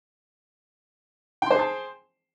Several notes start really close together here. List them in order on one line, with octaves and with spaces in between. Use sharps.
G5 C6 C5 G#4 A5